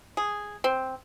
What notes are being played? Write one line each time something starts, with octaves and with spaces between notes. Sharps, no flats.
G#4
C4